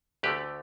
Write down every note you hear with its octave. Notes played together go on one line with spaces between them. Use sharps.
D2 D3 A3 G4 B4